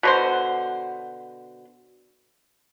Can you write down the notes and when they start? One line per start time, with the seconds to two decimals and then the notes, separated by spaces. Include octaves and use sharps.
0.03 B2 D3 C5